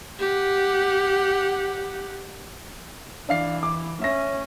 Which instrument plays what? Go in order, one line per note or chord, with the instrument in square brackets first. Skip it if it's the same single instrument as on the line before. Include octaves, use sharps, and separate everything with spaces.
[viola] G4 F#5
[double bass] E3 [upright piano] D4 F5 C7
[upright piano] D6
[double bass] C#4 [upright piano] E5 A#6